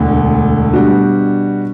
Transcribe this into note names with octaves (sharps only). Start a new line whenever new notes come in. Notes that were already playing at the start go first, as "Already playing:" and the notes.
Already playing: E1 D2 D3
B2 G3 D4 F#4